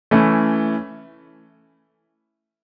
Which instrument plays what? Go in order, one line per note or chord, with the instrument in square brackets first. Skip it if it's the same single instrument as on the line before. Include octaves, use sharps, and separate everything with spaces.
[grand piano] E3 A3 C#4 E4